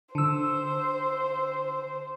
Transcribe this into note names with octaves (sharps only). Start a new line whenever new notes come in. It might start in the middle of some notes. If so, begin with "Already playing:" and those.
D3 C5 E6